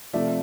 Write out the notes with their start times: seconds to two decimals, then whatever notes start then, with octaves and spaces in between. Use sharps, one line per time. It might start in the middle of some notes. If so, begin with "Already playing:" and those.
0.13 C3 F3 A3 D5 E5